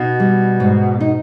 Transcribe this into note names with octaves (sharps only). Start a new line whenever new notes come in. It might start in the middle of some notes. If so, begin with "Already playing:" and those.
Already playing: B2 D#4
G3
G#2
D#4